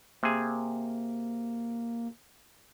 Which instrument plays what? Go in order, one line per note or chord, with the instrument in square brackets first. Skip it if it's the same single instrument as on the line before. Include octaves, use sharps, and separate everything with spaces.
[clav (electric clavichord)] C3 G#4 [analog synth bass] A#3